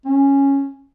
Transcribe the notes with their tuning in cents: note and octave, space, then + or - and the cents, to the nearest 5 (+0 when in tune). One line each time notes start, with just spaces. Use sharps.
C#4 -5